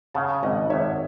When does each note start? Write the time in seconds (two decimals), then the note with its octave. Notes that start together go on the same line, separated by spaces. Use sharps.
0.14 C#3 F#5 A5
0.43 G#1 D#5 F#5
0.70 G#1 C#5 E5